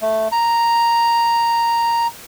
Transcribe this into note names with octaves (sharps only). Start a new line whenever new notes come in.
A3
A#5